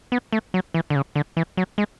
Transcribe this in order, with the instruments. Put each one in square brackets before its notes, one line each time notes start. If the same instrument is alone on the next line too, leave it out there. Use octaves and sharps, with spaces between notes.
[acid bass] B3
A3
F#3
E3
D3
C#3
D3
E3
F#3
G#3